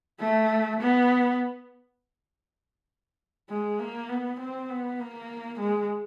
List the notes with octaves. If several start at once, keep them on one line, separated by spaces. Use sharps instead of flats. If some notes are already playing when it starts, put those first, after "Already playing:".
A3
B3
G#3
A#3
B3
C4
B3
A#3
G#3